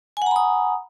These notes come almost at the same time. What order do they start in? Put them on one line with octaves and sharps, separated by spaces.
G#5 F#5 A#5 B5 D#6